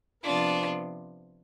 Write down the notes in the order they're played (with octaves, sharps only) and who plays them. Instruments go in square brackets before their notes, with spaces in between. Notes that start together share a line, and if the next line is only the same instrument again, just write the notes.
[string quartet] C3 F3 B3 D4 F4